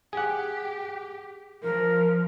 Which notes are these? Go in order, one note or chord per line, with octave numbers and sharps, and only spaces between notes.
G4 G#4 F#5
F3 A#4